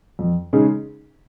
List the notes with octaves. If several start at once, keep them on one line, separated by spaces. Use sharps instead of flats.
F2
C#3 G#3 D#4 G#4